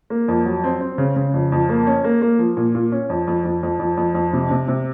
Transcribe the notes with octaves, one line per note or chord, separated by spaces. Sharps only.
A#3
F2
F#3
C4
C4
C#3
C#3
F2
F2
A#3
C#4
A#3
A#3
F3
A#2
A#2
C#4
F2
F2
F2
F2
F2
F2
F2
C3
C3
C3